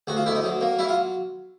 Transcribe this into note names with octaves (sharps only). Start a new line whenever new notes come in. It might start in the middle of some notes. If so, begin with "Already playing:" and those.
D2 F#4
F4
D2 E4
D#4
F#3
A#3
F#3 E4
F4